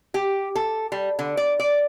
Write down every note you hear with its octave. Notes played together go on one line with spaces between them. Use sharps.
G4
A4
G3
D3
D5
D5